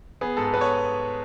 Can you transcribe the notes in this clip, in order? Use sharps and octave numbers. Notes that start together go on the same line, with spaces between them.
B3 G#4
G#2 A4
A4
B3 B4
C#5